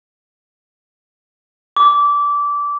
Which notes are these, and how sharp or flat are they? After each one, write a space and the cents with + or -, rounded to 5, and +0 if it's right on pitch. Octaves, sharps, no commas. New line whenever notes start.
D6 -20